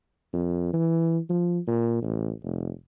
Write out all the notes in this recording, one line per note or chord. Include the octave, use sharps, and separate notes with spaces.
F2
E3
F3
A#2
A1
F1